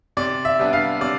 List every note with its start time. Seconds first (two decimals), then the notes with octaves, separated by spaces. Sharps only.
0.17 C3 D5
0.45 E5
0.59 G3 B3 D4
0.73 F5
1.01 C3 D5